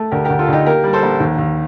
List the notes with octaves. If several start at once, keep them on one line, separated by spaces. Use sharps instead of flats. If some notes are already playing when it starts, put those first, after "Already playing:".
Already playing: A3
D2 G4 A#4
D2 G4 A#4
F4 A4
D2 D#4 G4
A#3 G4 A#4
G3
A4 C5
A#1
D#2
D#2